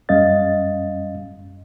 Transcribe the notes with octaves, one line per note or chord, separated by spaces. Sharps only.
F#2 G3 C#4 D#5 F5 A6